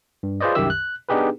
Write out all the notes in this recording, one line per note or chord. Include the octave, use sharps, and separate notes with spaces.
G2
F4 G#4 B4 C5 D5 D#5
C2 F#2 D#3 G4 E5 E6
F#6
B3 D4 D#4 G4 G#4 B4